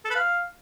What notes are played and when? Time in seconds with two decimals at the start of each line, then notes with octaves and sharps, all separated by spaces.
0.05 A4
0.10 B4
0.15 F5